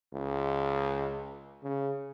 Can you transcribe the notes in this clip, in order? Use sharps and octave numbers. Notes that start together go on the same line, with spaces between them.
C#2
C#3